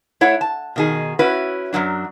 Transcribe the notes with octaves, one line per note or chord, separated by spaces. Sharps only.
A3 E4 C#5 F#5
A5
B2 D#3 G#4
C#4 E4 F#4 B4
F#2 A#2 F#3 D4